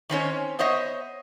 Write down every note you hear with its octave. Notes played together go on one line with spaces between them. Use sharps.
D#3 C4 C#4 C#5
B3 C5 C#5 D#5 E5